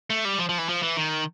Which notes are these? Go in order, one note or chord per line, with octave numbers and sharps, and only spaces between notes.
A3
G3
F3
F3
E3
F3
E3
D#3